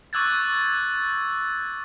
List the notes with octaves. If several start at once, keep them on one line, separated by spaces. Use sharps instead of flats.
C#6 D6 E6 F#6 G#6 A6